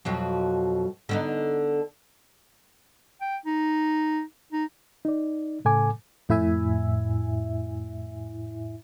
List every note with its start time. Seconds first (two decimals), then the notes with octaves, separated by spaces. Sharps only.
0.05 F2 B2 F#3
1.09 D3 B3 D#4
3.21 G5
3.46 D#4
4.53 D#4
5.05 D#4 D5
5.65 A2 C#3 A4 G#5 D6
6.29 F2 A2 E4 E5 G#5